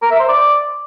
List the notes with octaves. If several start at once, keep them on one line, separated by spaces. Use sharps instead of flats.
A#4
E5
C5
D5